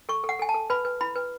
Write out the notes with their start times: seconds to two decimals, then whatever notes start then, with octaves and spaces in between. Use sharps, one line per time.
0.09 A4 C#6
0.24 A4
0.29 F#5
0.39 A4 G#5
0.49 A5
0.54 A4
0.70 B4 B5
0.85 B4
1.01 E4 B5
1.15 B4